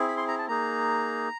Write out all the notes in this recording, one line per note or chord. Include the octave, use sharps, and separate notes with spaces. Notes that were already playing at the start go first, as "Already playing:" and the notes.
Already playing: C4 E4 G#4
B5
C6
A#5
A5
A#3 D#4 G#4 A#5